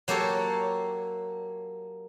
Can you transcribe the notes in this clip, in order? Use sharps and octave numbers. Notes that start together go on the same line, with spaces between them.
F#3 A#3 G4 A4 C#5